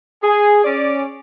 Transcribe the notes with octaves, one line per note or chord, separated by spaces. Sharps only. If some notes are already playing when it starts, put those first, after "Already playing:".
G#4
C#4 D5